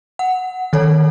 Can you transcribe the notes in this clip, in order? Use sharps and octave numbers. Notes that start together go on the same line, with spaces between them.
F#5
D#3 A4 C#5